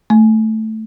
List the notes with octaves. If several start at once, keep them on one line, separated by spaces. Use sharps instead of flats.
A3